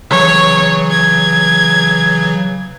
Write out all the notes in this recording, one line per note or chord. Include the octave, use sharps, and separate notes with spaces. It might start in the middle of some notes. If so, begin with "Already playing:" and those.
C#3 E3 F#3 C#5
G#6